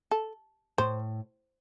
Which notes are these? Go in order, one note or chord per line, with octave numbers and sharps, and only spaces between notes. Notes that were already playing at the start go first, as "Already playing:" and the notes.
A4
A2 C5